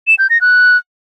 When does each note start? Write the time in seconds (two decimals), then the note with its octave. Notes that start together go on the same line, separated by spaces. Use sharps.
0.07 E7
0.19 G6
0.30 A#6
0.41 F#6